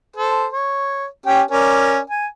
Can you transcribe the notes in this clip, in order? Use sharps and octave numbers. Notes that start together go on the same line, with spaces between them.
A4 C5
C#5
C#4 G4 G5
C#4 A#4 D5
G#5